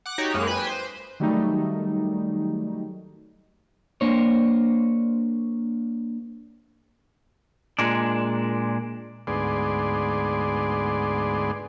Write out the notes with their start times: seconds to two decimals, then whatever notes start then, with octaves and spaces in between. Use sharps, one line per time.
0.06 F#5 D6 F#6
0.18 D#4 F#4 G4 C#5
0.34 F#2 G#3 A#3 F#6
0.47 B4 G5 G#5 E7
0.67 C5
1.20 D#3 F#3 G3 A3 D#4
4.01 A#3 D4 C5 C#5
7.79 A#2 G#3 D4
9.27 D2 G#2 B3 G#4 D5 C6